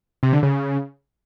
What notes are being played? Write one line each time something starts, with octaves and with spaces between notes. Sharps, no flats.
C3
D3
C#3